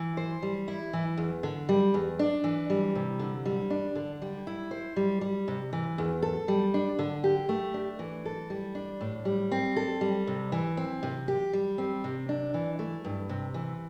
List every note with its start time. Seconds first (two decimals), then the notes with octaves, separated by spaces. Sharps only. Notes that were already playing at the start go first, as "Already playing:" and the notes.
Already playing: E3
0.17 C5
0.42 G3
0.68 E4
0.93 E3
1.18 E2
1.43 D3
1.69 G3
1.94 E2
2.19 D4
2.44 E3
2.70 G3
2.95 C3
3.19 D3
3.45 G3
3.70 D4
3.95 D3
4.22 G3
4.47 E4
4.71 C5
4.96 G3
5.21 G3
5.48 C3
5.73 E3
5.98 E2
6.23 A4
6.48 G3
6.74 D4
6.99 D3
7.24 G4
7.49 A3
7.74 D4
7.99 E3
8.25 A4
8.50 G3
8.75 D4
9.01 A2
9.25 G3
9.52 C4
9.76 A4
10.01 G3
10.27 C3
10.52 E3
10.77 C4
11.03 C3
11.28 G4
11.53 G3
11.78 C4
12.04 C3
12.29 D4
12.54 E3
12.79 A3
13.04 G2
13.29 C3
13.54 E3